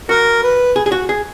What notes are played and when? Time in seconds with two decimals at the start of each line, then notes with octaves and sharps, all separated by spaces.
0.09 F#4 A#4
0.43 B4
0.76 G#4
0.86 G#4
0.92 F#4
1.09 G#4